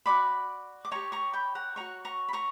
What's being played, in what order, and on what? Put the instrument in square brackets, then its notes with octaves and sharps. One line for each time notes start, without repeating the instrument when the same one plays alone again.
[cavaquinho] F#4 B4 D5 B5 D6
D6
G4 C#5 A#5 C#6
A#5 C#6
G5 B5
F#5 A#5
F#4 C#5 A#5 C#6
A#5 C#6
B5
A#5 C#6